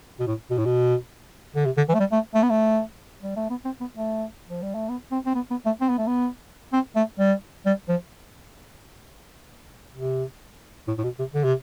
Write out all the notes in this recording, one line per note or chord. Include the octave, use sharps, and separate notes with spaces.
B2
A2
B2
A2
B2
D3
C3
D3
E3
A3
G3
A3
A3
B3
A3
G3
A3
B3
C4
B3
A3
F3
G3
A3
B3
C4
C4
B3
B3
A3
C4
B3
A3
B3
C4
A3
G3
G3
F3
C3
A2
A2
B2
C3
D3
C3